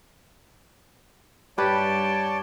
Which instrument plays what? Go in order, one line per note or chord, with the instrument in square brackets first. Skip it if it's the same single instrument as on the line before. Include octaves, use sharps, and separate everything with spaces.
[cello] G2 G5 [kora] G4 B4 [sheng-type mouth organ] C#5 D5 A5